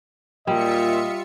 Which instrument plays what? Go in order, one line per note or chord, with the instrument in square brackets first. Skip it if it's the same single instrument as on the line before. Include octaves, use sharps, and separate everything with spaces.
[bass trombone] A#2 [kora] G3 [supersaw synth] F4 E5 C#7 [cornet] D#5